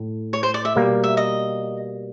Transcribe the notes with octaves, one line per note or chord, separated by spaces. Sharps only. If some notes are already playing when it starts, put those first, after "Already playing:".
Already playing: A2
C#5
C5
D5
E5
B2 G3 A#3
E5
D#5